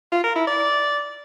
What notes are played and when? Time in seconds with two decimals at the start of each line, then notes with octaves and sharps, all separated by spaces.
0.12 F4
0.24 A#4
0.35 E4
0.47 D5